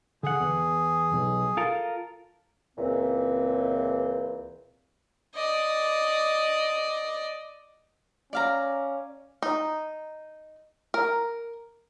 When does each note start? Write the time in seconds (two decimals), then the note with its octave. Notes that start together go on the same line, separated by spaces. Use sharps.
0.23 D3 G#4 F#5
0.40 E2
1.14 B1
1.57 F4 A4 A#4
2.77 C#2 A#2 E3 C4
5.35 D5 D#5
8.33 C#4 D5 F5 A#5
9.42 D#4
10.94 A#4